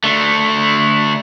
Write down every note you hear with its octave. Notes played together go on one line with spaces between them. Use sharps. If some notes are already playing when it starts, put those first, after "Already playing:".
D3 A3